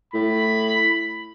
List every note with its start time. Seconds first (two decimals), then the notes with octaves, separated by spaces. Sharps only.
0.14 A2 B5